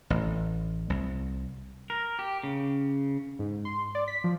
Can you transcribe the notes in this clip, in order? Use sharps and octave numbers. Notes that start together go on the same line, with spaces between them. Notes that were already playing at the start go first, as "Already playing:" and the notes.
A1
C2
A#4
G4
C#3
G#2
C6
D5
B6
F3